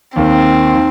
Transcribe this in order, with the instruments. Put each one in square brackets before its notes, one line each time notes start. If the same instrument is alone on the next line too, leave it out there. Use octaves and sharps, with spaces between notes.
[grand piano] D#2 D#3 A#3 [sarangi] C4
[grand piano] D#3